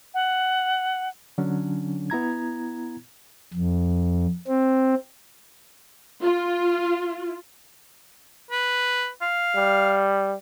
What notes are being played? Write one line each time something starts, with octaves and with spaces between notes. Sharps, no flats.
F#5
D3 F#3 C#4 D4
B3 E4 A#5 G#6
F2
C4
F4
B4
F5
G3